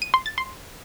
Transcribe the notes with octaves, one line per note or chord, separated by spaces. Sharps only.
D#7
C6
A6
C6